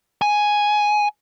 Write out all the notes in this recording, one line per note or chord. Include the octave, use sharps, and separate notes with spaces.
G#5